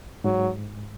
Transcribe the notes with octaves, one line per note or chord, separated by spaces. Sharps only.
G#2 F#3